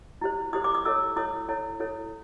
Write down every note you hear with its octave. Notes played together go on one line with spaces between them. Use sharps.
E4 G4 C5
E4 G4 C5 D#6
D6
D#6
E4 A4 C#5 E6
E4 A4 C#5 D#6
E4 A4 C#5
E4 A4 C#5